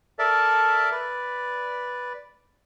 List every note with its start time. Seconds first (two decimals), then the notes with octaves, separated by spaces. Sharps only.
0.19 A4 A#4 D5 E5 A5
0.92 B4 D5